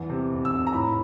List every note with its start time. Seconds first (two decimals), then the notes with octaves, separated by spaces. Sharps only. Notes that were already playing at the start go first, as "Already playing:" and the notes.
Already playing: E2
0.09 C3
0.31 F1
0.45 E6
0.52 F1
0.67 A#5
0.73 A2 B5